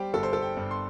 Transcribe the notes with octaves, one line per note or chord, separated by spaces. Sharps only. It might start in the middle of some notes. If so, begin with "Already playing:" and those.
Already playing: G3 G4 C5
G1 A4
C5
A4
G5
G2
C6